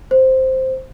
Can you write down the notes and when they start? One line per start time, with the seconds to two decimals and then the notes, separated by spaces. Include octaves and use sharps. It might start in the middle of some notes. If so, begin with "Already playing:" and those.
0.11 C5